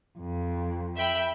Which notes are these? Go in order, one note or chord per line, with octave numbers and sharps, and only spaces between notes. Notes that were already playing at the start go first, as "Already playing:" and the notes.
F2
E5 G5 B5